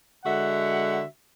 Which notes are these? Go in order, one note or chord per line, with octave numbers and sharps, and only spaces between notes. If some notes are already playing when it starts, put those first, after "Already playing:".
D3 G#3 F#4 E5 F#5